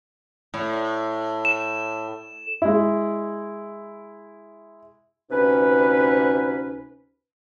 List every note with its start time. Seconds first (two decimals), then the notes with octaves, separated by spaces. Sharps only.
0.54 A2
1.45 E7
2.62 G#3 E4
5.30 D2 C3 C#4 D#4 B4